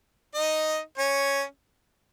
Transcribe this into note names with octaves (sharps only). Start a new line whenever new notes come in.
D#4 D#5
C#4 C#5